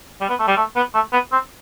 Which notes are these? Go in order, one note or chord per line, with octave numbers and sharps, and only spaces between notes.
G3
B3
A3
G3
A3
B3
A3
B3
C4